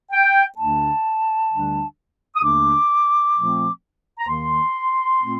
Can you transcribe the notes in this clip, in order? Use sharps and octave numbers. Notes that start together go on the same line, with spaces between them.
G5
D2 D3 A3 D4 A5
D2 D3 G3 D4
D#6
D#2 D3 A3 D4 D6
A#2 F3 A3 C4
A#5
D#2 D#3 A#3 C6
A#2 A3 C4